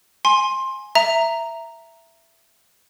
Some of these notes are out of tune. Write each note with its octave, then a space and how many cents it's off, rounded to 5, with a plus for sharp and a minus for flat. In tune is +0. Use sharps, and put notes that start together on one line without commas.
G#5 +0 C6 +15
E5 +10 A#5 -5